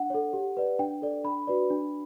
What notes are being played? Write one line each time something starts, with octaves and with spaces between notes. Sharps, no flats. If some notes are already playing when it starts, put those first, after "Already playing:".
Already playing: D4 F#5
A4 C#5
G4
B4 D5
D4 G5
A4 D5
D4 B5
F#4 B4 D5
D4